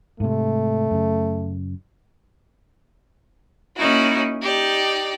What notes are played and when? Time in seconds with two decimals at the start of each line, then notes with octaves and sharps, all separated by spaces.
0.20 G#2 C3 A3
0.91 F#2 C#3
3.77 A#3 C#4 D#4 E4 F#4
4.43 D#4 G4 D5